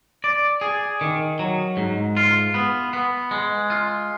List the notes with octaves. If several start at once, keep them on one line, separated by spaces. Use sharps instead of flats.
D5
G#4
D#3
F#3
G#2
F4
B3
B3
G#3
F4